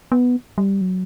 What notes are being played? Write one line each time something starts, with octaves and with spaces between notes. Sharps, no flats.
B3
G3
F#3